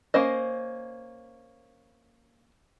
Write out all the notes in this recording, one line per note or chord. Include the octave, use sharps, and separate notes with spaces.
A#3 C#4 C5 D#5